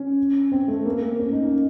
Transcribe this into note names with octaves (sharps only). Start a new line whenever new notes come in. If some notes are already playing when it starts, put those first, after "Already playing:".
Already playing: C#4
C4
A3
A#3
C#4
D#4
C#4